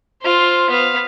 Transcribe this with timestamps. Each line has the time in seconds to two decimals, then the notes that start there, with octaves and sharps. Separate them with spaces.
0.22 F4 C5
0.70 B3 F5